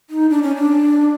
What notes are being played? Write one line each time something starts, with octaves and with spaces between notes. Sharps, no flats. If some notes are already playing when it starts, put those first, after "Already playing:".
D#4
D4
C#4
D4